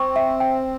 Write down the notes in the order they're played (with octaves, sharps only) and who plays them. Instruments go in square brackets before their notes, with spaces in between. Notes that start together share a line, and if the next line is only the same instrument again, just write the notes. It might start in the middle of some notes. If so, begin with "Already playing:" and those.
Already playing: [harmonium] C4 [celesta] C#6
[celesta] E5
G5